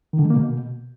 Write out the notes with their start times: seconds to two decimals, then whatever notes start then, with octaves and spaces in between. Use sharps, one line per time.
0.13 D#3
0.19 D3
0.25 G#3
0.30 A#3
0.36 B2